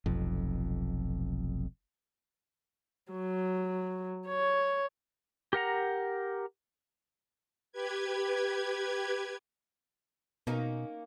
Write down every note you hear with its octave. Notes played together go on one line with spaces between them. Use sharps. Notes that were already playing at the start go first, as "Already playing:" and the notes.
F1 B1 F2
F#3
C#5
G4 A#4 F#5 A#5
G4 B4 G#6
B2 A#3 C#4 D#4